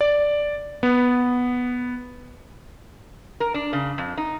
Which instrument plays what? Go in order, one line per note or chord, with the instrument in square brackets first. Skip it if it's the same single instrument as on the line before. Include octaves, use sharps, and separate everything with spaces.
[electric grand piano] D5
B3
[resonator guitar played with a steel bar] A#4
D4
C#3
F2
D#4